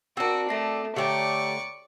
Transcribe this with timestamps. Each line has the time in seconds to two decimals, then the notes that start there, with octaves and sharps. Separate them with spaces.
0.17 C4 D4 F#4 A#4
0.49 A3 A4 A#6 C7
0.96 D3 A3 G4 C#5 D5 G5 A#5 C#6